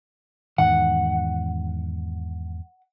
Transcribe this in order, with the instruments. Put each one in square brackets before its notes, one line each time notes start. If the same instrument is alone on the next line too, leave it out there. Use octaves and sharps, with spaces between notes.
[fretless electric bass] E2 G#2 D#3 [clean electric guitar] F#5